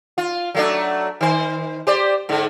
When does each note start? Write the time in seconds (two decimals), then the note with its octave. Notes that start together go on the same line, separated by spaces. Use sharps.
0.18 F4
0.54 F#3 A3 D4
1.21 D#3 C5
1.87 G4 C5 D5
2.29 G#2 D3